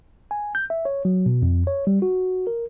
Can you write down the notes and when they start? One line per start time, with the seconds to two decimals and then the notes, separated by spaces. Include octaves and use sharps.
0.31 G#5
0.55 G6
0.70 E5
0.85 C#5
1.05 F#3
1.26 B2
1.42 F2
1.67 C#5
1.87 G3
2.02 F#4
2.47 A#4